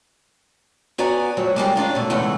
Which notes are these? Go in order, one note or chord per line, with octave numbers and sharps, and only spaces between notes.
B3 F#4 D5 G#5 A#5
F2 F#3 A3
G#2 G3 G#3 A#3
C#4 D4 F4 A#4
B2 A3
E2 A2 C#3 G#3 A3 F#5